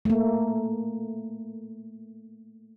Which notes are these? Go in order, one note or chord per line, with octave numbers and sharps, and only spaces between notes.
A3 A#3